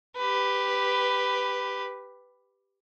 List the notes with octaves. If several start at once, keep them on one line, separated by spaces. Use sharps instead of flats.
G4 B4